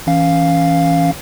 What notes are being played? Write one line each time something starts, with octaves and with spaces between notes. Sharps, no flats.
E3 C#4 F5